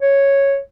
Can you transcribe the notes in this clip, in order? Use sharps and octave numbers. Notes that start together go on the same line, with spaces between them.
C#5